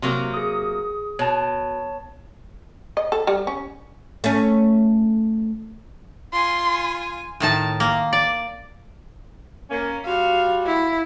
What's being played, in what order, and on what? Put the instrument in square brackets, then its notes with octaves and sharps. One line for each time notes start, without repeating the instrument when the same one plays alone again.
[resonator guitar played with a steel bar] C3 F#3 A#3
[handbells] G#4 D#6
[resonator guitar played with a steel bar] B2 [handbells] C#5 A5
[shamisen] D#5
A4
G3
C#4
[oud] A3 C#4
[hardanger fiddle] F4 G#5 [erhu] C6
[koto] A2 D#3 A5
A#3
D5
[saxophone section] A#3 C#4
[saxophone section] G3 F4 F#4 [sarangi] F5
[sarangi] E4